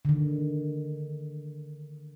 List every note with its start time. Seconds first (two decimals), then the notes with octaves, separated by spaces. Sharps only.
0.05 D3 D#3